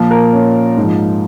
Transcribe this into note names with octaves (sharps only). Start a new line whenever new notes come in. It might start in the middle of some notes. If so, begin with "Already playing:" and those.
Already playing: A#2 F3
A#4
C#4
G#2 F3